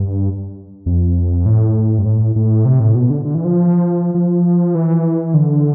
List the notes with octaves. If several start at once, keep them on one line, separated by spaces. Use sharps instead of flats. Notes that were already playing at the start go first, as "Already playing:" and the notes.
Already playing: G2
F2
A2
G2
A2
A2
C3
A2
B2
D3
D3
E3
F3
F3
E3
D3